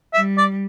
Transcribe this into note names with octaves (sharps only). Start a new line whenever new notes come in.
G3 E5
D5